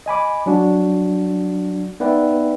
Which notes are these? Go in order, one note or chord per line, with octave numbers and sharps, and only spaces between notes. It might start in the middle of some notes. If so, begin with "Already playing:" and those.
D#5 G#5 B5 D6
F#3 D4 F#4
B3 D#4 B4 D5 E5 G5